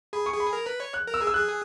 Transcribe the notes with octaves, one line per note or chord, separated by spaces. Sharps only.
G#4 B5
C#6
G#4
B5
A#4
B4
C#5
F#6
A#4
E6
G#4
E6
G#4 F#6